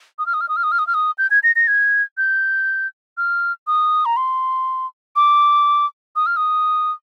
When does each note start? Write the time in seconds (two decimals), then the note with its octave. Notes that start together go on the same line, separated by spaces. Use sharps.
0.19 D#6
0.26 F6
0.34 D#6
0.41 F6
0.49 D#6
0.56 F6
0.63 D#6
0.72 F6
0.79 D#6
0.87 F6
0.94 D#6
1.18 G6
1.30 G#6
1.43 A#6
1.56 A#6
1.67 G#6
2.17 G6
3.17 F6
3.67 D#6
4.05 A#5
4.17 C6
5.16 D6
6.16 D#6
6.26 F6
6.37 D#6